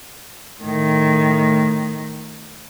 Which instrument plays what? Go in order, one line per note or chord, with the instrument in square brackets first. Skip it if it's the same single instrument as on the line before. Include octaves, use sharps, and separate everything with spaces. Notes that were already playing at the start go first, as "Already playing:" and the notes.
[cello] A2 D#3